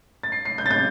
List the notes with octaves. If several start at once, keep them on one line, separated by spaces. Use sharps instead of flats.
A6
C7
C7
G6
A6
G6